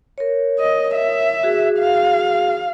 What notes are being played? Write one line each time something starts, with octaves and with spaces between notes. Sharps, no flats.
A#4 C#5
D#5
E5
F#4 G#4
F5